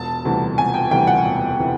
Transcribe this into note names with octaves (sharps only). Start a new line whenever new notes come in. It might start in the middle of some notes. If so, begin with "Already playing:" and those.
Already playing: E1 A5
D2 C3 E3 G3
E1 G#5
G5
D2 C3 E3 G3 G5
F#5
E1
C3 E3